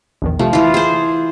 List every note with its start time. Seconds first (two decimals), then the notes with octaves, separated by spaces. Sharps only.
0.22 A#1 E2 D#3
0.39 C3 F3 A3
0.53 E3 F4
0.74 G#4 C5